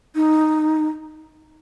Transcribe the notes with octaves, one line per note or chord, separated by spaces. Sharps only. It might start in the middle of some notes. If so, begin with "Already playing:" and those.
D#4